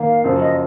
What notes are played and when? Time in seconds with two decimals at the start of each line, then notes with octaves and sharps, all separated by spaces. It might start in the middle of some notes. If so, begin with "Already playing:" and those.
Already playing: D#3 A#3 F5
0.24 F#2 C#3 F3
0.39 D#5